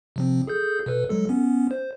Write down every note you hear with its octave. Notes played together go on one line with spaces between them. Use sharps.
C3 F3 C4
G#4 A4 G6
B2 A4 B4
F#3 G#3 A4
B3 C#4
C5